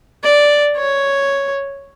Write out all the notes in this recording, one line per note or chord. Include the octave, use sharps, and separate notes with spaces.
D5
C#5